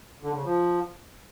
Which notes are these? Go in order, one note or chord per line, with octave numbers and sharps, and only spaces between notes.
D3
C#3
F3